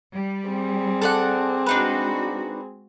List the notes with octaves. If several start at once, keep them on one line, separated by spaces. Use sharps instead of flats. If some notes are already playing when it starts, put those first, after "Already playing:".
G3
C4 G#4
A4 D5 F#5
G#3 D4 D#4 F#4 B4